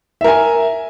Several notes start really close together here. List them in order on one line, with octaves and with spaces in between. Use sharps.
E5 A#4 G#5